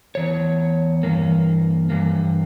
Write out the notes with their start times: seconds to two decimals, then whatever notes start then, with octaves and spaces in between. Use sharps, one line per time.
0.15 E2 E3 C#5
1.03 G2 E3 A#3
1.90 G2 E3 A#3